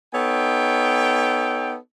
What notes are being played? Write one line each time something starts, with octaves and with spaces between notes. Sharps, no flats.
B3 D#4 A4 C#5 G5